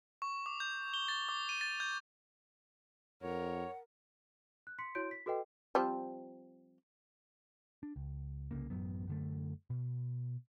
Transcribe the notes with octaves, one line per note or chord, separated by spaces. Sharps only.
C#6
D6
G6
G7
A6
D6
D#7
A6
G6
F2 A#4 C#5 F#5
F#6
C6 B6 C#7
E4 F#4 C#5 C6 G6 D7
B6
F#4 A4 B4 D#5 G5
F3 G3 C4
D4
C#2
C2 C#3 A#3
A1 F#2 F#3 B3
F#2 D3 A3
B2